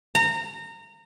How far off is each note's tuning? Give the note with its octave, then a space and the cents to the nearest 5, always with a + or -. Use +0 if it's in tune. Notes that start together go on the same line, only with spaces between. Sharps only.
A#5 -25